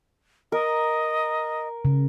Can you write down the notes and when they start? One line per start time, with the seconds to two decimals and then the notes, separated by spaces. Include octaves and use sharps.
0.52 A#4 D#5
1.85 C#3